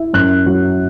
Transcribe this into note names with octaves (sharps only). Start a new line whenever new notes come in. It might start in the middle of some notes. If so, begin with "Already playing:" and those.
Already playing: E4
F#2 F#6
F#3